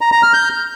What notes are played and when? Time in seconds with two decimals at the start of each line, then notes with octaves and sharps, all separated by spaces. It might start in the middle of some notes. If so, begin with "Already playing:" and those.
0.01 A#5
0.12 A#5
0.23 F6
0.33 G6